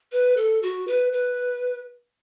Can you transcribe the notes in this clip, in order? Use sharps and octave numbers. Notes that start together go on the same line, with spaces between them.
B4
A4
F#4
B4
B4